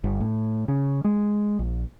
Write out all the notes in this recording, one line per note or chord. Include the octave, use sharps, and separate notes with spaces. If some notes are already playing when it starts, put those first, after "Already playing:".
G1
A2
C#3
G#3
A#1